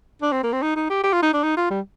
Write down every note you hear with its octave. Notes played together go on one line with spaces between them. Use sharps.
D4
C4
A#3
C4
D#4
D#4
G4
G4
F4
D#4
D4
D#4
F4
G3